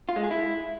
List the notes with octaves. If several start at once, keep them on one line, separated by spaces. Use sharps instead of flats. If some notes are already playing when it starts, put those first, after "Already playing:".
F4
G#3
G#4
E4